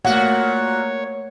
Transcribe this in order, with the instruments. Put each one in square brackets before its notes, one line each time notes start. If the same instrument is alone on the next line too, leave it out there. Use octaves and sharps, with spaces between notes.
[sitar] A#2 F#4 [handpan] A3 F#5 [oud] A#3 [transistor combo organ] C#5